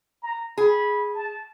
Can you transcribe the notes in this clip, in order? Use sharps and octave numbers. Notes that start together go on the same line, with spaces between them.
A#5
G#4 B5
A5